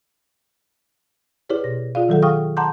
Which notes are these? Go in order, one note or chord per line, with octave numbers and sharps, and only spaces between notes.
E4 G4 G#4 B4 C#5 D5
B2 A#6
F4 G#4 D5 F5
D#3 F#3 A4 F#5
G#4 F5 G5 C#6 D#6 F6
F#5 A5 A#5 C6 D6 G6